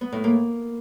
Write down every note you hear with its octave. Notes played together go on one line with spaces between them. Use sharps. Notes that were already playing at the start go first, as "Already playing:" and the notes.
B3
A2
A#3